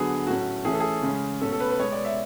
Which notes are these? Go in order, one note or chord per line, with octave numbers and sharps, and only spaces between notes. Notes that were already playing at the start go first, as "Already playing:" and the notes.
Already playing: D3 F#3 B3 G#4
A2 F#3 A3 C#4 F#4
E3 A3 C#4 G#4
A4
G#4
C#3 G#3 C#4
B2 A3 C#4 A4
A4
B4
B4
B2 G#3 B3 C#5
D5
E5